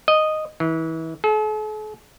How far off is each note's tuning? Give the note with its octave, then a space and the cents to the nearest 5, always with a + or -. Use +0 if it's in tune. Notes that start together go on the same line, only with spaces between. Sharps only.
D#5 -5
E3 -30
A4 -45